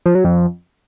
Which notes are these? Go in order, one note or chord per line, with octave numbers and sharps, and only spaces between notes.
F3
F#3
F2